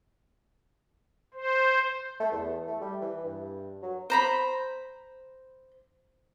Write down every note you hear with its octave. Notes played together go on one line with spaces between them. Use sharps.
C5
A3
E2
A3
G3
E3
G2
F#3
C5 A#5 B5